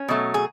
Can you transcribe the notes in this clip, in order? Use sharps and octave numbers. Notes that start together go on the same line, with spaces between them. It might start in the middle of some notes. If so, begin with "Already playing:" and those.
Already playing: C#4
B2 F#3 A3
G#4